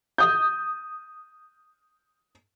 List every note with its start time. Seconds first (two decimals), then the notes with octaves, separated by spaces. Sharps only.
0.18 D#6 G6